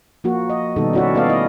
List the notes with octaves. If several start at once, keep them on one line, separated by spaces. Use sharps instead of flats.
F3 A#3 F#4
D#5
B2 D#3 G3 B3 D#4 A4
C#4 E4 F#4 D5 E5
A3 B3 A4 D5 D#5 F5
E4 D#5